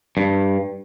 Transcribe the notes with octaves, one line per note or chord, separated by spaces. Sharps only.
G2